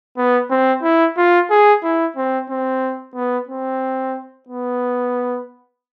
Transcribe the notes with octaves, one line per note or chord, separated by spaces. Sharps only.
B3
C4
E4
F4
G#4
E4
C4
C4
B3
C4
B3